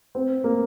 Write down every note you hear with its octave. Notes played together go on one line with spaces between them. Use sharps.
C4
A#3